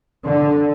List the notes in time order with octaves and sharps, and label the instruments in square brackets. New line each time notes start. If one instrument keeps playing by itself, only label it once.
[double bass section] D3